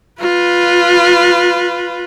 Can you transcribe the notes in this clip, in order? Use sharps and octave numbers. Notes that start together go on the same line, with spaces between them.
F4 B4